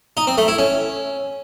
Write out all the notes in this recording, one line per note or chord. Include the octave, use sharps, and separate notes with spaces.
D#4
C4
A3
E4
C#4